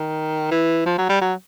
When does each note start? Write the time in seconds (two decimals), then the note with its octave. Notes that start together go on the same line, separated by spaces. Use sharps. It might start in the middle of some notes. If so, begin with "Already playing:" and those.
Already playing: D#3
0.51 E3
0.86 F3
0.98 F#3
1.10 G3
1.21 F#3